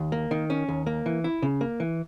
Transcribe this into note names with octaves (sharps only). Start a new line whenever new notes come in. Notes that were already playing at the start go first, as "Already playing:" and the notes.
Already playing: D#2
A#3
D#3
C#4
D#2
A#3
E3
E4
C#3
A#3
E3